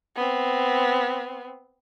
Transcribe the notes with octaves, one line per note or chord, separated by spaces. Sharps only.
B3 C4